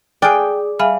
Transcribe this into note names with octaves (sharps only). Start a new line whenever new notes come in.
G#4 D5 G5 G#5 F6 F#6
G3 E5 F5 G#5